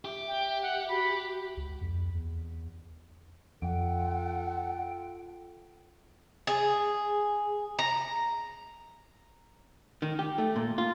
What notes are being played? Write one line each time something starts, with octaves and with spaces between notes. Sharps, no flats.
G4 E5
G5
F#5
F#4 B5
C#2
F2
E2
F2 F4 A4 F#5 G5
G#4
A#5
D#3
G4
A3
A#2
F4